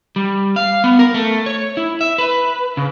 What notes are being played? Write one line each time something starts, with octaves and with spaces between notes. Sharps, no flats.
G3
F5
B3
A#4
A3
C#5
E4
E5
B4
C#3